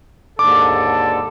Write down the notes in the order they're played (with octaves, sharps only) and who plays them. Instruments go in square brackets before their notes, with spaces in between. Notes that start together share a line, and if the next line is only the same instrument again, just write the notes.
[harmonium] D#2 G#2 D3 [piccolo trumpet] A4 [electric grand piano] D6